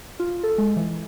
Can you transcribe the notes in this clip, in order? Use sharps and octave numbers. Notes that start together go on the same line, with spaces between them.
F4
A4
G#3
E3